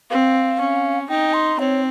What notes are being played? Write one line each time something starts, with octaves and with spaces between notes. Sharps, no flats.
C4 F5
C#4
D#4 G5
C6
C4 C#5